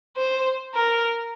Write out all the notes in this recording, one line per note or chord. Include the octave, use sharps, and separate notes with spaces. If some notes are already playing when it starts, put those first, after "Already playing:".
C5
A#4